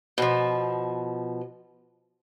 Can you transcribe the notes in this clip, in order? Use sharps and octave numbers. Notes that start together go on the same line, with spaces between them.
B2 F3